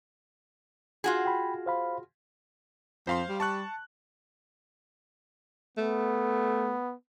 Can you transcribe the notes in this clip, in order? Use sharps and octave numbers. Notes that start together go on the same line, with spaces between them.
F4 F#4 G#4
G5 B5
C5 F5 B5
F2 C5 F5 C6
G3
A5 C#6 F#6
A3 B3